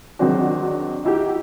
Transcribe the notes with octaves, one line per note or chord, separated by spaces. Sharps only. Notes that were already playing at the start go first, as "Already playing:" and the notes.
D#3 F#3 G#3 C4 D4 F#4
D#4 E4 F#4 G4